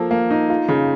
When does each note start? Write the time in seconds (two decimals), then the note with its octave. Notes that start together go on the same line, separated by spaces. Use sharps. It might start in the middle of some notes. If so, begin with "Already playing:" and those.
Already playing: F3 A#3 A4
0.11 A#3
0.31 D#4
0.50 F4
0.69 C#3